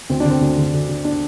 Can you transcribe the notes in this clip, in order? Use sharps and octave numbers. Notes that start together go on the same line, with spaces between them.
D2 C4
D3 D4
C4
D2
D3
D2
D3
D4